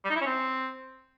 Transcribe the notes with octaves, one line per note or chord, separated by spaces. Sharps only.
G3
D#4
E4
C#4
C4